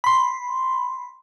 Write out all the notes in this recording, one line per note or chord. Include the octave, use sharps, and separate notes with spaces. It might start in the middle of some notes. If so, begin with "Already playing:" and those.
B5 C6